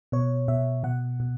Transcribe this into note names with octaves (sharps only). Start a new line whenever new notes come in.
B2 C#5
B2 E5
B2 F#5
B2